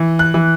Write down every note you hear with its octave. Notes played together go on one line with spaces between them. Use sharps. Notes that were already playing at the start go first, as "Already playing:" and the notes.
Already playing: E3
F#6
E3